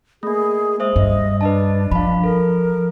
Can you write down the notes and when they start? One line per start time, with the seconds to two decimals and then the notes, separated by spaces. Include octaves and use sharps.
0.23 A3 A#3 G#4
0.80 G#3 C5 E5 D#6
0.96 G2 D#5
1.41 D4 B4 D#5 A5
1.91 F3 F5 B5
2.24 A4 A#4